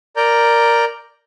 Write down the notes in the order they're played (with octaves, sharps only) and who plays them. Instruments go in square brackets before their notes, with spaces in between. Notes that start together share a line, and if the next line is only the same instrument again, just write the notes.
[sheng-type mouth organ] A#4 D5 A#5 G6